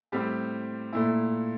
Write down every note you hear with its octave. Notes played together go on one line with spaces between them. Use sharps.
A2 G3 C4 G4
A#2 A3 E4